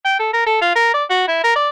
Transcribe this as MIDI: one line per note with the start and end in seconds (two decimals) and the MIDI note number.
0.05 0.19 79
0.19 0.30 69
0.33 0.44 70
0.47 0.61 69
0.62 0.71 65
0.75 0.90 70
0.94 1.04 74
1.10 1.28 66
1.28 1.42 64
1.44 1.53 70
1.56 1.69 74